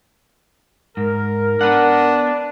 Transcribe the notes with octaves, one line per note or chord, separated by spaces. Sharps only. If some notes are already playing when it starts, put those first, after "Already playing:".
G#2 A#4
B3 D4 F#5